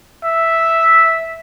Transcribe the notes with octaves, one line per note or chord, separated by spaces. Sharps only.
E5